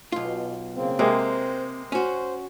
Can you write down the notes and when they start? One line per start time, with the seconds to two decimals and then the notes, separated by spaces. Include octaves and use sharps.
0.12 B1 B2 F4
0.74 C#3 A#3 C4
0.99 C3 G#3 A#3 C4 C5
1.92 C#4 F#4 C5